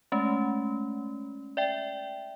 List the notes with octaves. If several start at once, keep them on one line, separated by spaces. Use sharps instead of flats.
G#3 A3 C#4
D5 E5 G5